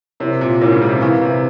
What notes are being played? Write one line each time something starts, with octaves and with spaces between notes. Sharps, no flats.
C3 E4 A#4 C#5
A#2
G#2 E4 A#4 C#5
C#3
C3
C#3
E3 E4 A#4 F5 G#5 C#6
C3